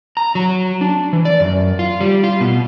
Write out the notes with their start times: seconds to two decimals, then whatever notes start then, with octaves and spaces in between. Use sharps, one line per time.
0.17 A#5
0.35 F#3
0.81 D4
1.13 E3
1.25 D5
1.40 F#2
1.79 F4
2.01 G3
2.24 F4
2.41 B2